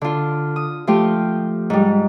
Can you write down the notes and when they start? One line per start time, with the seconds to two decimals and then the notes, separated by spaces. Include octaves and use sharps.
0.01 D3 F4
0.56 D#6
0.87 F3 A3 F4 G4
1.70 G#2 G3